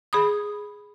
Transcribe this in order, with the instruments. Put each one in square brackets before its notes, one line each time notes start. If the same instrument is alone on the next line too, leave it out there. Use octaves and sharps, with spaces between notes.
[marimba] G#4 B5 D#6